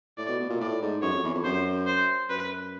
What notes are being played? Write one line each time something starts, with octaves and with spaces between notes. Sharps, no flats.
A2 D5
B2
B2
A#2
A2 D5
G#2
F#2 C#5
F2
E2
F2
F#2 C5
C5
F#2 B4